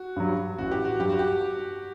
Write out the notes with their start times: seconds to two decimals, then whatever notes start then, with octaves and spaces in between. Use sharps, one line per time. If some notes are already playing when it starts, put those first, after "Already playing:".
Already playing: F#4
0.16 G2 F#3
0.58 A1 F#4
0.71 G4
0.85 F#4
0.99 G2 F#3 G4
1.09 F#4
1.19 G4